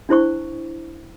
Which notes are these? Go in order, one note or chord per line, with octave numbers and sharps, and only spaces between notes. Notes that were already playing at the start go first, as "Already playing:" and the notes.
D4 E4 C5 C#6